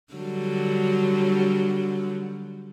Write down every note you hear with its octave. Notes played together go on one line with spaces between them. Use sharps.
D3 F#3 G3